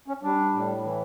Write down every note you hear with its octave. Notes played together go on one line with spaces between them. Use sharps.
C#4
G3 D4
A2
E3